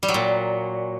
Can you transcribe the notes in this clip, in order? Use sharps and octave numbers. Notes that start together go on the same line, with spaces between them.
G3
F#3
A#2